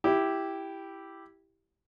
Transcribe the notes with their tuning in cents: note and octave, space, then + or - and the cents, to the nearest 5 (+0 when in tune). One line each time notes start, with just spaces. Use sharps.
E4 +0 G4 +0